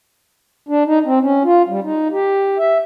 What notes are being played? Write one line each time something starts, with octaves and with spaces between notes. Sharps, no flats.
D4
D#4
C4
C#4
F4
G3
D#4
G4
E5